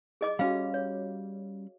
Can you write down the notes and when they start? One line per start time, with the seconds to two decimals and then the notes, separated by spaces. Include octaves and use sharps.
0.21 G#4 D#5 D6
0.39 G3 C#4 F#4 F5
0.74 C#5